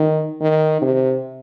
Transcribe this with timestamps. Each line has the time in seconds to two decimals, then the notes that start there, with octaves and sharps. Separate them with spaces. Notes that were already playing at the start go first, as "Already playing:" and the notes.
Already playing: D#3
0.41 D#3
0.82 C3